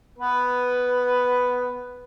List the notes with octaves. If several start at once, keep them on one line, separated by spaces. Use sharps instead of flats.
B3 B4